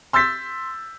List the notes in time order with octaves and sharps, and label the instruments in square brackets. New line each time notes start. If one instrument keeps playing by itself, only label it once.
[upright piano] C6 E6 G6 A6 B6